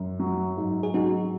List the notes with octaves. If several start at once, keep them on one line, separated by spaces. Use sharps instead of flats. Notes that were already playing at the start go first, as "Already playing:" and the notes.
Already playing: F#2
F#3
G#2
G#4
F#3 D#4 F#4